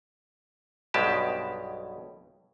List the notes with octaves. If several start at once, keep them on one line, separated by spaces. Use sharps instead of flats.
B1 G2 B2 G#3 G4 A5